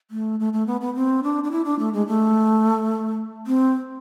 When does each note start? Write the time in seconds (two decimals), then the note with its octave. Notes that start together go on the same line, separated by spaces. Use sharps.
0.11 A3
0.40 A3
0.53 A3
0.67 B3
0.81 B3
0.95 C4
1.23 D4
1.44 D4
1.51 E4
1.65 D4
1.79 A3
1.93 G#3
2.07 A3
3.47 C4